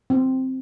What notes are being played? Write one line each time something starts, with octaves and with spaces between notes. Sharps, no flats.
C4